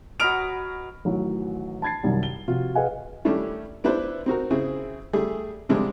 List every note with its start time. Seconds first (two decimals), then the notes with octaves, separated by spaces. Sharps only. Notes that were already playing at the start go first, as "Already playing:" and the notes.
0.20 F#3 B4 D#5 F6 D7 F7
1.05 A1 D#3 E3 F#3
1.82 A5 B5 G#6 A6 C7
2.03 C2 F#2 D#3 G3
2.23 G7
2.48 C3 F3 F4 F#4
2.75 G#4 B4 D#5 F5 F#5 G#5
3.25 D#3 G3 A3 C#4 D4 E4
3.84 B3 D4 E4 B4 C5
4.26 C4 D#4 F#4 A#4
4.51 C#3 C4 E4 G#4
5.13 G3 A3 G#4
5.69 C3 F3 G3 G#3 D4